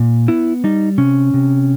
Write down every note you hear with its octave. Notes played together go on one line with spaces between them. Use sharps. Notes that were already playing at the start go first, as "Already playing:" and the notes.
Already playing: A#2
B3 E4
G3 D#4
C3 C#4
C3